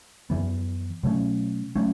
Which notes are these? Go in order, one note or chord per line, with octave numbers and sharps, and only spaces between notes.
F#2 E3 B3
B2 F#3 A3 C#4
F#3 A3 C#4